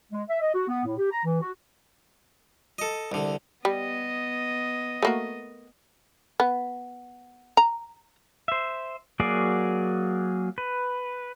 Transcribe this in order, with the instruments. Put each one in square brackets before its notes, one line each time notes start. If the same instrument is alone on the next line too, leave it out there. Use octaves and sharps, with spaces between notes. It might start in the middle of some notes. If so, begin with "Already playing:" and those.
[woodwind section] G#3
E5
D#5
F#4
B3
A2
G4
A#5
E3
F#4
[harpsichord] A4 D#5
C2 D3
[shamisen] G3 [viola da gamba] B3 D#5
[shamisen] A3 A#3 F#4
B3
A#5
[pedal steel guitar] C5 E5
F#3 A#3 F#4 G#4 D5
B4